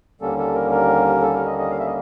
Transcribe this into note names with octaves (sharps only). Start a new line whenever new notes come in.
D#2 D3 G3 A#3 C#4 A4
A4
A#4
A#4
A4
A#4
D#5
D#5
F5
E5
D#5